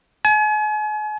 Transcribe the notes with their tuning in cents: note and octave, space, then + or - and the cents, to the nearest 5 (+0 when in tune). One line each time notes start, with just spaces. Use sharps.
G#5 +40